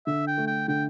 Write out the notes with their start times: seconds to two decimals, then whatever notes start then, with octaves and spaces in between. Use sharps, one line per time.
0.07 D3 E5
0.27 G5
0.38 A3
0.47 G5
0.68 D3 G5